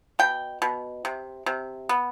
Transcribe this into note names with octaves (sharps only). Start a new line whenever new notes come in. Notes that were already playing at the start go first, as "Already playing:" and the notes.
B2 G5
B2
C3
C3
B3